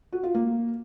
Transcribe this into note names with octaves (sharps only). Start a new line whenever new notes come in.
F#4
F4
A#3